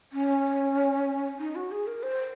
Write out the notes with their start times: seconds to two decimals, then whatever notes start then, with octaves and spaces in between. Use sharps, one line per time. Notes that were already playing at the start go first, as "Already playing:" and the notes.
0.13 C#4
1.39 D#4
1.55 F#4
1.71 G#4
1.87 A#4
2.03 C5